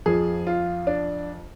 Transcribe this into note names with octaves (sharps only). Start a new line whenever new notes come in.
F2 F3 G#4
F4
D4